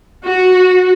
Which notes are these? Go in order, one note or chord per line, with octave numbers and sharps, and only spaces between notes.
F#4